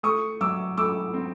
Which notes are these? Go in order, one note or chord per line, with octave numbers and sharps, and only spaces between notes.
A3 C#6 D#6
F#3 D6 E6
A3 D6 E6
C4